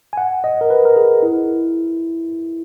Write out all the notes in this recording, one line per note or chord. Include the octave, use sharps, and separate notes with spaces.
G#5
F#5
D#5
A#4
B4
A#4
G#4
E4